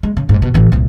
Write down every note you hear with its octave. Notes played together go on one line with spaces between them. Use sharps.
G#3
C#3
F#1 G#2
B2
A1 E3
D#1 C2